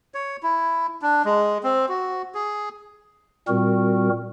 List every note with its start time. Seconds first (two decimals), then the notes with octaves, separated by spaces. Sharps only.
0.14 C#5
0.43 E4
1.02 D4
1.25 G#3
1.64 C4
1.89 F#4
2.35 G#4
3.48 A#2 G3 C4 F#4 A#4